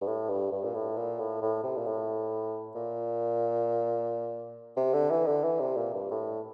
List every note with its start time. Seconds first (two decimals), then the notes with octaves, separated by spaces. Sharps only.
0.01 G2
0.07 A2
0.29 G2
0.52 G2
0.64 A#2
0.74 A2
0.97 A#2
1.19 A2
1.42 A2
1.63 C3
1.77 A#2
1.86 A2
2.75 A#2
4.77 C3
4.93 D3
5.10 E3
5.26 D3
5.44 E3
5.60 C3
5.77 A#2
5.94 G2
6.11 A2